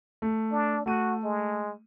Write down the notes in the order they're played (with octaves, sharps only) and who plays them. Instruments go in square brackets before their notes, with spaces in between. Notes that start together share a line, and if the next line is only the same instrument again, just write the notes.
[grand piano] A3
[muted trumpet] D4
[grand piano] A3 D#7 [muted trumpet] F#4
[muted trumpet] G#3